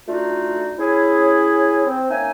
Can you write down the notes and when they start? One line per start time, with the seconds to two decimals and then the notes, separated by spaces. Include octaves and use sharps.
0.07 A3 D4 D#4 F4 F#4
0.78 C#4 E4 G#4
1.86 C4
2.09 A#3 C#4 D#4 E5 G#5